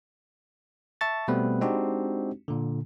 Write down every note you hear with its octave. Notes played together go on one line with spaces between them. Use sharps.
E5 A5 C#6 A6
B2 G3 A3 B3 C4 B4
G#3 C4 D4 D#4 F#4 G4
A#2 D3